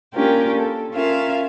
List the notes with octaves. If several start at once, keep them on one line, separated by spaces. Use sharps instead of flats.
A#3 C#4 D4 F4 G4 A#4
A4
C#4 F4 A#4 E5 F5